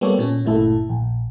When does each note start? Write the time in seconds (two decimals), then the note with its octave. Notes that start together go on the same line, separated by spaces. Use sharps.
0.01 G3 A#3 B3 G4 A4 C#5
0.19 A#2 C#4
0.45 G1 A#2 A3 E4 A4
0.89 A#1